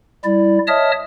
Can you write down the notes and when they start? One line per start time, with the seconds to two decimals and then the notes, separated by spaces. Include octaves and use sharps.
0.24 G3 E4 D5
0.68 C#5 D#5 E5 A5 D#6 F6